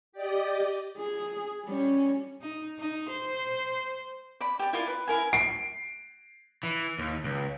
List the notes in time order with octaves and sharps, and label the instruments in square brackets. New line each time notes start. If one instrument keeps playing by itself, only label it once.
[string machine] G4 D5 D#5
[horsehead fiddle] G#4
G3 C#4
[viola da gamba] D#4
D#4
C5
[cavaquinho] D5 B5
G4 D5
E4 F4 A#4 D5
B4
E4 A#4 G#5
[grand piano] C7 D7
[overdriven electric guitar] E3
D#2
C#2